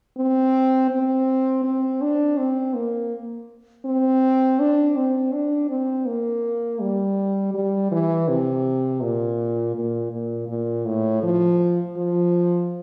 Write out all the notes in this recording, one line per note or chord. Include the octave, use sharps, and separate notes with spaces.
C4
C4
C4
D4
C4
A#3
C4
D4
C4
D4
C4
A#3
G3
G3
E3
C3
A#2
A#2
A#2
A#2
A2
F3
F3